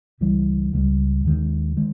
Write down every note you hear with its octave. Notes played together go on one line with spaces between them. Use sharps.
C#2 C#3 E3 G3
C#2 C#3 E3 G3
D#2 D#3 G#3
D#3 G#3